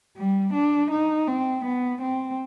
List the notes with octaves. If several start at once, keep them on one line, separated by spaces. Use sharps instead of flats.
G3
D4
D#4
C4
B3
C4